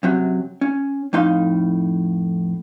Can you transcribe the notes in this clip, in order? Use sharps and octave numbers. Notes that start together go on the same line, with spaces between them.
F#2 C3 F#3
C#4
F2 A2 D#4 F5 C6